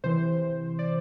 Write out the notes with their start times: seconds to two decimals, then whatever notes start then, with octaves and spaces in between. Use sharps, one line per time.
0.04 C3 E3 C5
0.79 D5